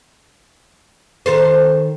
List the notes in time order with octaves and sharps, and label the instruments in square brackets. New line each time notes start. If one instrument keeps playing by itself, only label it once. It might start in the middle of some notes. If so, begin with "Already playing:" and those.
[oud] D#3 A4 C5